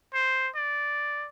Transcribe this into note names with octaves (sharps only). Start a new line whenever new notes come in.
C5
D5